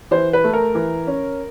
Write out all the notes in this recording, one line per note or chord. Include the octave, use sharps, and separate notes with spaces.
E3 C5
B4
A3
A#4
E3
C#4